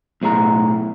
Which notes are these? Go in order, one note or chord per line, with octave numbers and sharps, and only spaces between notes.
B1 A2 G#4 A#5